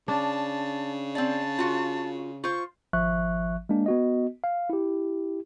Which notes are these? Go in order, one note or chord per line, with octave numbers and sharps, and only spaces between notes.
C#3 D4 A5
C4 D5 A5
F4 F#4
F4 C5 C#6
G#1 F3 E5 C#6 F#6
G#3 A#3 D4
B3 F#4 D#5
F5
E4 G4